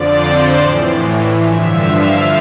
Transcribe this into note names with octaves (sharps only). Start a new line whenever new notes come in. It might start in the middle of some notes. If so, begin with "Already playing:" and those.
Already playing: F2 D3 F3 D5
C5
A2 E3
G2 D3 F3 E5
F5